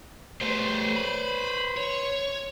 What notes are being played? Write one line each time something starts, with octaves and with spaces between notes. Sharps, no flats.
G3 A3 B4 C5
B5
C#5